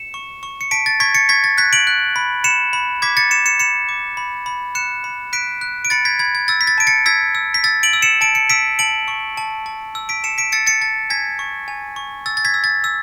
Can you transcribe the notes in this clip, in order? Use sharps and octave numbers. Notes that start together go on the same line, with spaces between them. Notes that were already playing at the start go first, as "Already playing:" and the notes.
Already playing: C#7 E7
C#6
C#6
C#7
A5 B6 D7
A6
C#6 G#6 B6
A6 C#7
C#6 G#6 B6
A6
F#6 G#6 B6
D7 F#7
F#6
B5
B5 C#7 E7
B5
D6 G#6 B6
A6 C#7
D6 C#7 E7
C#7 E7
B5 C#7 E7
D6
B5
B5
F#6 C#7 E7
B5
F#6 B6 D7
F#6
D7
B5 A6 C#7
G#6 B6
B5 G#6
G#6
E6 A6
B6
A6
A5 D7
A6 C#7
E6 G#6 B6
E6
B6
E6 A6
D7 F#7
E6
C#7 E7
A5 D7
C#7
E6 B6 D7
A5 D7 F#7
C#6
A5
A5
E6
B6 D7
A5 C#7 E7
B6 D7
E6 A6 C#7
A6 C#7
A5 A6
G#5 G#6 B6
C#6
G#5
C#6
E6 A6
A6
G#6 B6
E6
A6
E6